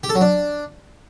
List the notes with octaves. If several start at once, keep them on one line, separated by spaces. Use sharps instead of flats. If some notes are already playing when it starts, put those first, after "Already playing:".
G4
A4
F#3
D4